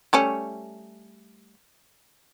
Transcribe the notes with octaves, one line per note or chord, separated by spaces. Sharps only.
G3 A3 C#4